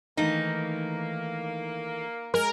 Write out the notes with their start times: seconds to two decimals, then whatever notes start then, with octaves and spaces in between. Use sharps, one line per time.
0.17 D#3 E3 A3 A#3 D#4
2.34 G#3 A#4